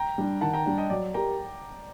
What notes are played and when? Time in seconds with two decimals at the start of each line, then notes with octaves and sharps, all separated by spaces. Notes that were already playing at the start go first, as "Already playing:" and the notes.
Already playing: G5 A#5
0.18 G3 D4
0.41 D#3 F#5 A5
0.53 G5 A#5
0.66 G3 D4
0.78 D#5 G5
0.90 F#3 D5
1.14 G4 A#4 G5 A#5